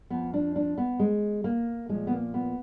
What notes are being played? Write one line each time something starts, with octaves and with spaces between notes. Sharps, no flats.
F2 F3 B3
D4
D4
B3
G#3
A#3
A#2 F3 G#3
B3
A#3
B3